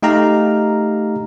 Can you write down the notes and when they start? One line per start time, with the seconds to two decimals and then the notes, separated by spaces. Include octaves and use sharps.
0.03 A3 D#4 G4 F5 A#5